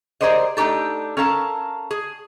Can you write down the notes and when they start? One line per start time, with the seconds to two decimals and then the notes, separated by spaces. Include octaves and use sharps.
0.21 G4 G#4 A#4 C5 D5 D#5
0.57 A3 D4 D#4 G4 A4
1.17 C#4 A4 A#4 F5 A5
1.91 G#4